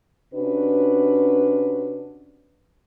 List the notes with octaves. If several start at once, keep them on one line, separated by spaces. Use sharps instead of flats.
C3 C#4 D4 F#4 B4